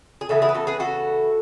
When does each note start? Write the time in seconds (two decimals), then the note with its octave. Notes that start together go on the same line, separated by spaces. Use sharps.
0.21 G#4
0.29 C#3 E3 B3 F#4 A4
0.42 E4 G#4
0.49 B4
0.54 F#4 A4
0.67 G#4 B4
0.80 F#4 A4